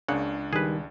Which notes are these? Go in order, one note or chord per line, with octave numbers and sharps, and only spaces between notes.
C#2 C#3 A#3 D4 F#5
D#3 G3 G#4 B4